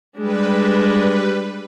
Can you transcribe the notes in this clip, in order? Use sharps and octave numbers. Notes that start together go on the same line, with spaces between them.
G3 G#3 D4 B4